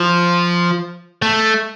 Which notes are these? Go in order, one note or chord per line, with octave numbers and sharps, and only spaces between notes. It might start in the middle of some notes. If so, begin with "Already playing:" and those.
Already playing: F3
A3